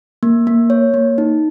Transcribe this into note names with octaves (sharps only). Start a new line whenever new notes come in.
A#3
A#3
C#5
A#3
D#4